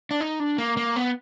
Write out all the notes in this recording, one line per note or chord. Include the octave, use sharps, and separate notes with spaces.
D4
D#4
D4
A#3
A#3
B3